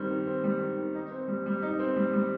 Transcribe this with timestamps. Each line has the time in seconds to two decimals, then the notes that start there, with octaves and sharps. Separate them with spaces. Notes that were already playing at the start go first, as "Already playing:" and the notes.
Already playing: D#3 G3 C4
0.10 D#3
0.27 C4
0.44 G3
0.61 D#3
0.78 D#3
0.95 D#4
1.11 C4
1.28 G3
1.46 G3
1.62 D#4
1.79 C4
1.96 G3
2.13 G3